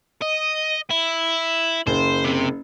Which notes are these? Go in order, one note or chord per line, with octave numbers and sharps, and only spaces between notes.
D#5
E4
F#1 C5
C3